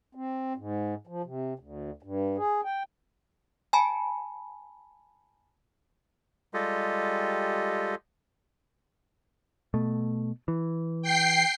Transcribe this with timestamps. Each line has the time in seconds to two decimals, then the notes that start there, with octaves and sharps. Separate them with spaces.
0.15 C4
0.57 G#2
1.07 F3
1.24 C3
1.59 D2
2.03 G2
2.38 G#4
2.65 G5
3.73 G#5 A5 B5
6.54 G3 G#3 F4 G4 A4 D#5
9.74 B2 A3
10.48 E3
11.02 G5 C7